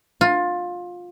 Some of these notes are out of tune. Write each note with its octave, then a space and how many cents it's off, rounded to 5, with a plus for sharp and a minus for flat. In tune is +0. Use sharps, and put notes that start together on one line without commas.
F4 +20